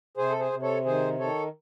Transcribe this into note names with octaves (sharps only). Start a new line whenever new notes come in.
C3 G#4 C5
A4
G#4 C5
C3
A4 C#5
D#3 G#4 C5
D#3 A4 C#5